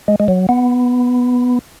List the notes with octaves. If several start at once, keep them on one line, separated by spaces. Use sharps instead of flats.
G#3
G#3
F#3
B3